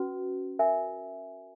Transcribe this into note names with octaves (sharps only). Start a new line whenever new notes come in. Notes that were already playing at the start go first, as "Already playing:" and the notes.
Already playing: C#4 F#4 B4
A#4 E5 G#5